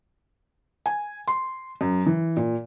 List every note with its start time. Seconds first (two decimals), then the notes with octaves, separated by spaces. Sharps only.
0.86 G#5
1.28 C6
1.81 F#2
2.06 E3
2.37 A#2